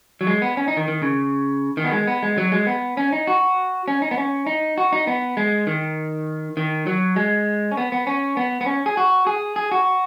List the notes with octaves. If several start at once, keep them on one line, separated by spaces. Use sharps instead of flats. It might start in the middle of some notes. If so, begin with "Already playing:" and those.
F#3
G#3
B3
C#4
D#4
D#3
D#3
C#3
D#3
B3
G#3
B3
G#3
F#3
G#3
B3
C#4
D#4
F#4
C#4
D#4
B3
C#4
D#4
F#4
D#4
B3
G#3
D#3
D#3
F#3
G#3
C#4
B3
B3
C#4
B3
B3
C#4
G#4
F#4
G#4
G#4
F#4